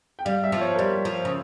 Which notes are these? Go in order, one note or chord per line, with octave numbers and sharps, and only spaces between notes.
G5
G3 F5
E5
F3
C#5
A#4
G3 C5
F3
C#3